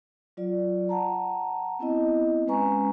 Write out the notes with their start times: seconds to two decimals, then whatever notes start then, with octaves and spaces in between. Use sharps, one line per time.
0.37 F#3 F4 D5
0.89 F#5 A5 A#5
1.79 B3 C4 E4 D#5
2.47 G#3 C#4 B4 G#5 A#5 C#6